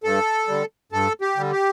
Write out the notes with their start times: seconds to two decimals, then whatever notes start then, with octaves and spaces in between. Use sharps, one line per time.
0.03 G2 A4
0.48 D3 G3
0.92 G2 A4
1.21 G4
1.37 D3 G3
1.51 G4